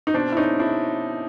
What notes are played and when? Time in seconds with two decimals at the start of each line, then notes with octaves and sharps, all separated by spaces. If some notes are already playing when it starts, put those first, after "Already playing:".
0.07 D#4
0.14 B2 C4 D4
0.32 E4
0.37 C#4 D#4
0.59 D4 E4